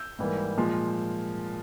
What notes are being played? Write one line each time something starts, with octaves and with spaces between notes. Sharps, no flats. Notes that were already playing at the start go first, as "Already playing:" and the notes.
Already playing: E6 G6
G#2 E3 G3 A#3
A#2 F3 G#3